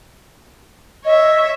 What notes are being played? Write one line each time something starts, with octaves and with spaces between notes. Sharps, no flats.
C#5 D#5 E5